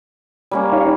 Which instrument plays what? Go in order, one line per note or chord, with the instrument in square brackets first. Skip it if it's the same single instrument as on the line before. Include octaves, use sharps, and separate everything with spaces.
[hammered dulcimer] G3 A#3 C#4
[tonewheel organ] D#4 C#5 F5